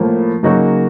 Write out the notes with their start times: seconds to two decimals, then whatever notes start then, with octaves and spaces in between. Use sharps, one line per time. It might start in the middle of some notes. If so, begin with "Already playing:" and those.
Already playing: A2 F3 A#3
0.43 C#3 F#3 A#3 D#4 F#4